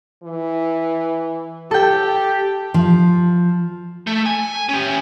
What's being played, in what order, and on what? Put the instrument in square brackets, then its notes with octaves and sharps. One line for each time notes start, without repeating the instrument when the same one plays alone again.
[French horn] E3
[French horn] G4 [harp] A4 G5
[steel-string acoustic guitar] F3
[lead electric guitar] A3
G#5
C#4 G4